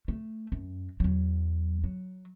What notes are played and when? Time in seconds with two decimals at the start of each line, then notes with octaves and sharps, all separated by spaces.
0.08 A3
0.52 F#2
1.00 E2 F#3
1.84 F#3